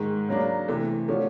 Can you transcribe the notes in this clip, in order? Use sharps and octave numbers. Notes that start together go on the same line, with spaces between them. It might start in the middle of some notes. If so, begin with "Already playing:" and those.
Already playing: G#2 D#3 G#3
C#3 F#3 A#3 D4
C3 E3 A3
D3 F3 A3 C#4